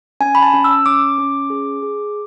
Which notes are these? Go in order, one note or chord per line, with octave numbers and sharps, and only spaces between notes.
C#4 G#5
B5
A5
C#4
E6
C#4 D6
C#4
G#4
G#4